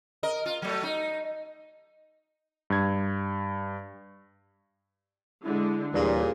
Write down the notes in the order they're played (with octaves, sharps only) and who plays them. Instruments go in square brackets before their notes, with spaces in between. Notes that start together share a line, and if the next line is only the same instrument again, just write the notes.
[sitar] A#4 D#5
F4
F#3 A3
D#4
[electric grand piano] G2 G#6
[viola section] D3 G#3 [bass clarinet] E4
[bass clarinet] D#2 [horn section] A#2 [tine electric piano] E3 G3 D4 [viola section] G#4